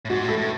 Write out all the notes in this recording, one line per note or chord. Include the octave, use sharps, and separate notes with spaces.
A2
G#2 F#4
A2 A4
A2